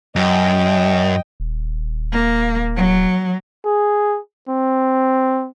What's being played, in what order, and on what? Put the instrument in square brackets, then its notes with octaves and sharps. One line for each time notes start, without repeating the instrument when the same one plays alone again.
[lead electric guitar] F#2 [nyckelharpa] D#5 G5
[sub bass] D#1
[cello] A#3
F#3
[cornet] G#4
C4